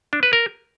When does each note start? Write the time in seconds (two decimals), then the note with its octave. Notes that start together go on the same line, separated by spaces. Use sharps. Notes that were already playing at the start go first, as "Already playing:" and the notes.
0.13 D4
0.23 B4
0.33 A#4